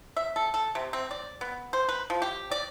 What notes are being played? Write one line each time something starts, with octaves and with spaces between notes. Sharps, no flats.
E5
A4
A4
C3
C4
D5
B3
C5
B4
F3
G4
D5